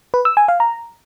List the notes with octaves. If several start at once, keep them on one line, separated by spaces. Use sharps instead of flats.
B4
E6
G#5
F5
A#5